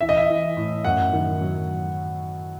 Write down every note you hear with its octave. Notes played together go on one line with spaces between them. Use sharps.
E3 E5
D#5
E5
E3
A2
F#2 F#5
D#3
F#3